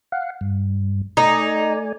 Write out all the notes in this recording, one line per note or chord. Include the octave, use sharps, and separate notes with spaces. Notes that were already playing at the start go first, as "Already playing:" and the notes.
F5 F#5
G2
A3 D#4 D5 G#5